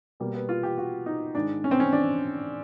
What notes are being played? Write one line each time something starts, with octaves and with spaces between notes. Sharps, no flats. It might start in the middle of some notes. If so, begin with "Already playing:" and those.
B2 G3 A#3
B3
F4
G4
F#4
D#4
G#2 D#3 G#3 D4
C#4
C4
C#4
D4